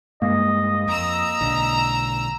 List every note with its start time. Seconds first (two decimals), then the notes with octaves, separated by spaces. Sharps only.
0.22 G2 G#3 A#3 D#5
0.88 F2 A#5 E6
1.41 B1 D3